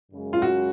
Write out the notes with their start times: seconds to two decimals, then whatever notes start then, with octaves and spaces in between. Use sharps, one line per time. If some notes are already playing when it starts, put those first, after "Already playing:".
0.11 F#2 C#3 G#3
0.33 F4
0.42 F#4